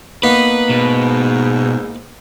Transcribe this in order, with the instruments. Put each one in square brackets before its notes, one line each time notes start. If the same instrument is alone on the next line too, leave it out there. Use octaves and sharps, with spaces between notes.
[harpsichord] A#3 B3 D#4 [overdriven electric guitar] B4
[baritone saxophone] G#2 [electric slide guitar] B2